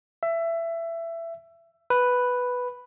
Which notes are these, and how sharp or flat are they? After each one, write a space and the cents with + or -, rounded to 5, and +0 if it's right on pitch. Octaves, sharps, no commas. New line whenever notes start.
E5 +20
B4 +0